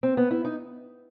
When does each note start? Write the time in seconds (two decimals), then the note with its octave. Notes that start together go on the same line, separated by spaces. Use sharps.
0.03 C4
0.17 B3
0.31 E4
0.45 D#4